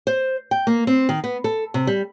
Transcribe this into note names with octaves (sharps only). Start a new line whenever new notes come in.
C5
G5
A#3
C4
D#3
B3
A4
C3
G3